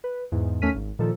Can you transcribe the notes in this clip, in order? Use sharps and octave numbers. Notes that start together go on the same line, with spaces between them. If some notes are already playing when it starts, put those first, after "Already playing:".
B4
E2 G#2
D#2 A3 C#4 F6 B6 D#7
G#1
A#2 D#3 F3 A4